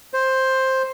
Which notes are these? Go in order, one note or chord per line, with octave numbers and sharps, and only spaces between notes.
C5